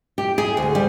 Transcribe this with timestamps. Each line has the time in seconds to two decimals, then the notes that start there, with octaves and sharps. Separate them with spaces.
0.18 G4
0.38 G#4
0.57 D2
0.75 G3